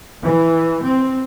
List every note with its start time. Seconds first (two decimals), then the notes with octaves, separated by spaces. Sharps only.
0.23 E3
0.84 C4